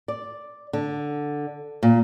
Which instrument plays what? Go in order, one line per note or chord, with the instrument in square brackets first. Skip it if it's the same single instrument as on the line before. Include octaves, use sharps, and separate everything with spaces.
[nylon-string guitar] D5
D3
A#2